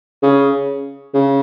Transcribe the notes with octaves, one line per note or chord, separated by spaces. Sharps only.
C#3
C#3